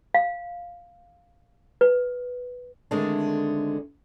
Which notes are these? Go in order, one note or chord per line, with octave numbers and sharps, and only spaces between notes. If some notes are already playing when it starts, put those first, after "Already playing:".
F5
B4
D3 D#3 G#3 A3 C4 D4